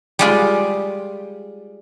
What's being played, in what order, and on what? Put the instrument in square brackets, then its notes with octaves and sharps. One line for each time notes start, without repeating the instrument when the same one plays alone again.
[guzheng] G3 G#3 F4